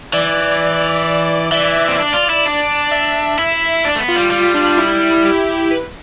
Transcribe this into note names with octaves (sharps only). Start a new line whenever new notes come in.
E3 D5
D5
E3 E5
C4
D4 D5
F4
E4
D4
E5
E4
D4 D5
A3
B3
F4
G3
G3 F4
D4
E4
G4
B4